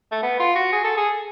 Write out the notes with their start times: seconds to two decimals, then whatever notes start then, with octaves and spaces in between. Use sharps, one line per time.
0.12 A3
0.23 B3
0.40 F4
0.55 F#4
0.72 G#4
0.84 A4
0.97 G#4